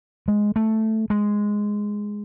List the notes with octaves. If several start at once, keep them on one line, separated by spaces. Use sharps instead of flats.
G#3
A3
G#3